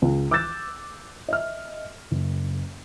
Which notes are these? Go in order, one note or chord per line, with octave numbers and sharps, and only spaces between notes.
C#2
D6 E6 F#6 G6 A6 E7
D#5 E5 F6
F#1